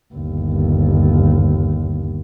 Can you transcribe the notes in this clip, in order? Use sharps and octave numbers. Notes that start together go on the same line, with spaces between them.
G1 D#2